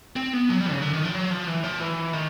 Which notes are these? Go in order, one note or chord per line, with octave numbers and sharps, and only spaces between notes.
C4
B3
F#3
G3
C#3
D3
D#3
F3
F#3
F3
E3
F3
E3
D#3